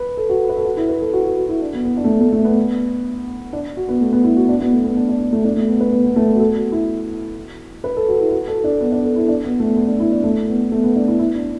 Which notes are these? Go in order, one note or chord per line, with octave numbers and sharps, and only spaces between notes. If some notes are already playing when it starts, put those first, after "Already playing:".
Already playing: B4
A4
F#4
B4
A4
F#4
E4
B4
A4
F#4
F#4
E4
D4
B3
B3
D4
A3
B3
A3
A3
B3
D4
F#4
B3
A3
B3
E4
F#4
D4
B3
A3
B3
D4
D4
A3
D4
A3
B3
B4
B3
B3
A3
B3
F#4
A4
F#4
E4
B4
A4
F#4
E4
F#4
A4
D4
B3
D4
A4
E4
D4
B3
A3
B3
D4
E4
D4
A3
B3
A3
B3
D4
E4
E4
D4